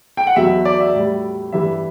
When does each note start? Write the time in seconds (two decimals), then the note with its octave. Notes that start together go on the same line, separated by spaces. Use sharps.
0.17 G5
0.27 F#5
0.36 E2 B2 F#3 E5
0.65 D5
0.80 E5
0.94 A2 G3
1.52 G2 E3 G3 E5